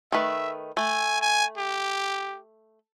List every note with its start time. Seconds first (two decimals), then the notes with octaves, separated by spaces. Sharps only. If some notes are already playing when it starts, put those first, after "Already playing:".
0.12 D#3 A3 B4 E5
0.77 A3 G#5
1.21 G#5
1.58 G4